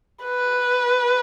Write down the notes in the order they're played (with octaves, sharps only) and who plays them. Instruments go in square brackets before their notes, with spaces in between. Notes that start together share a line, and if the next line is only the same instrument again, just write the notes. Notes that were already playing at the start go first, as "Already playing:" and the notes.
[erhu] B4